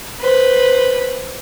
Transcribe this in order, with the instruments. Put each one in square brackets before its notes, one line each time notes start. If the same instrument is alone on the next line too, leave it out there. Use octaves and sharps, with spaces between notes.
[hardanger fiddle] B4 C5